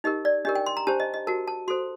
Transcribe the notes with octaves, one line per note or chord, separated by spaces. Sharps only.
D#4 G4 A#4 D#5
D5
D4 G4 A#4 D#5
G5
C6
A#5
D4 G4 C5 A5
D#5
D#5
F#4 A#4 A5
A5
F#4 A4 C5 C6